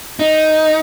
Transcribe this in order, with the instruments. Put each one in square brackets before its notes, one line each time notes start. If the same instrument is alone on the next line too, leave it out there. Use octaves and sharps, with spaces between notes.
[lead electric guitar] D#4